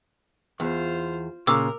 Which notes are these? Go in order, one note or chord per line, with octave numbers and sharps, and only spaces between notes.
E2 F4 C5
A#2 C#3 A#4 D6 E6